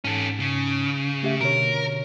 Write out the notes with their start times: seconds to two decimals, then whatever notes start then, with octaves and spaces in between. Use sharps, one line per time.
0.04 G#2 C#4 A4
0.40 C#3
1.23 A3 G4 E5
1.41 B2 D3 A#4 C#5